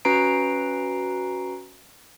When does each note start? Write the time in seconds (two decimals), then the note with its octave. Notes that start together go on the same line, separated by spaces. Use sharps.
0.05 C#4 F#4 B4 A#5 C7 D7